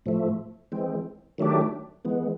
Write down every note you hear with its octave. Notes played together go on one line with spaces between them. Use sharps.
A2 F3 A3
E3 G#3 C4
D#3 F#3 A3 D4 G4
E3 G#3 B3